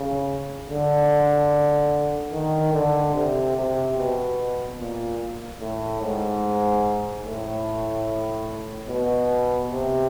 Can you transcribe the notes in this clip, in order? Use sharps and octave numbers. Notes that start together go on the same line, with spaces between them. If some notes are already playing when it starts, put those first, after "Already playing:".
Already playing: C#3
D3
D#3
D3
C3
C3
B2
A#2
A2
G#2
A2
B2
C3